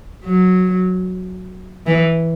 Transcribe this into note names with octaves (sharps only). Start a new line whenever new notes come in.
F#3
E3